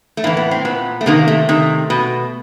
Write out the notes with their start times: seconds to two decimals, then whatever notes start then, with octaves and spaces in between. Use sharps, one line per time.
0.17 A3
0.24 A2 E3 A#3
0.37 B3
0.51 C4
0.65 A#2 B3
1.01 A3
1.06 C3 D#3 A#3
1.28 A3
1.49 C3 D#3
1.90 B2